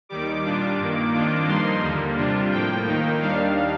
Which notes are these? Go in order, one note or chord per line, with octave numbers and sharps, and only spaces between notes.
D#2 D#3 G3 D6
A#2 G3 D4 F4
G2 D#3 A#3
F2 D#3 A#3 D4 F4
G2 F3 A#3 D#4 C6
D#2 D3 G3 A#3
C3 G3 D4 F4
A2 F3 A#3 G5
D#2 D#3 A#3 D#4
D#2 D#3 G3 D4 F5